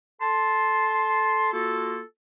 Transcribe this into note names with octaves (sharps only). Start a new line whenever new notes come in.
A4 A5 C6
A#3 F4 F#4 A4